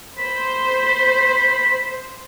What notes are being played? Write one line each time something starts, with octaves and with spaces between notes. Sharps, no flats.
C5 B5